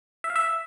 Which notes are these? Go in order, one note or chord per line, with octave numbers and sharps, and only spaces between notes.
E5
F5
E5